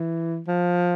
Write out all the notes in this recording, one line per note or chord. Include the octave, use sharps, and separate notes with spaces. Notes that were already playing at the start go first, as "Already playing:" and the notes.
Already playing: E3
F3